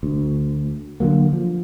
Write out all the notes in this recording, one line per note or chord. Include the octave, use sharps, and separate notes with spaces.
D2
D3 E3 F#3 A#3
F3